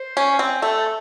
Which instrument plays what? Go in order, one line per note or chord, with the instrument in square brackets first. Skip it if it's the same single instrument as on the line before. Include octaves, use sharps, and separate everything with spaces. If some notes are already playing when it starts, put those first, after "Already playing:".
Already playing: [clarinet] C5
[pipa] C#4
C4
[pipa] A3 [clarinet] A4